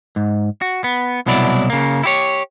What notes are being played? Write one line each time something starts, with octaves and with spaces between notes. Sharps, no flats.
G#2
F#4
B3
C2 B2 F#3 E4 A#4 D5
C#3 A#3
E4 G4 C#5